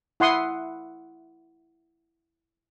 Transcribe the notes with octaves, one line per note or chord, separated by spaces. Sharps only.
E4 F#5 C6 D#6